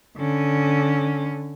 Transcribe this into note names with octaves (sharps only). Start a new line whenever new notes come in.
D3 C#4